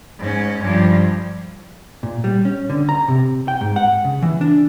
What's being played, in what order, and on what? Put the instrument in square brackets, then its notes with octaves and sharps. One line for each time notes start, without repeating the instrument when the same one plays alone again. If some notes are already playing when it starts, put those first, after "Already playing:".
[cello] G#2 C#4
G2 F3
[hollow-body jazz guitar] A#2
G3
C#4
D3
A#5
C3
G5
G#2
F#5
C#3
E3
D4